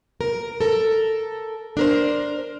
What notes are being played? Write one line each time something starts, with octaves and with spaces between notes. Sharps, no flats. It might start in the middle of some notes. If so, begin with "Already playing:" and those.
A#4
A4 A#4
D4 A#4 C5